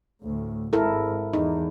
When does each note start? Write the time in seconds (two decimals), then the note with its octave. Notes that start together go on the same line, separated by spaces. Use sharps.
0.22 D2 A2
0.73 G#1 G#2 E4 A4 A#4
1.33 E2 E3 D#4